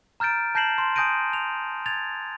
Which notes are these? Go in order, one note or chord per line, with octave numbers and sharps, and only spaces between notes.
A#5 F6 G6 A6 D7
A5 G6 A#6 C7 E7 F#7
C6
G#5 D#6 G6 A#6 D7 D#7
F7
G#6 A6 F7